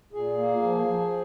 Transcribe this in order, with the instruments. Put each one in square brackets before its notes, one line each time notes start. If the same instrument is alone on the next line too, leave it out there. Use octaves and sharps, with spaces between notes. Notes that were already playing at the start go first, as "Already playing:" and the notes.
[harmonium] A#2 G#4
A#3
F3
F3